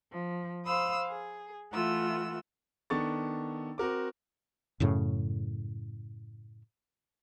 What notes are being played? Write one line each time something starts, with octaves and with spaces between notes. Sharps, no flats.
F3
C5 F5 B5 D#6 E6
G#4
E3 A3 F4 F#5 E6
D#3 B3 D4 A4 C#6 A6
C4 F#4 A#4 D6
F#2 A2 C#3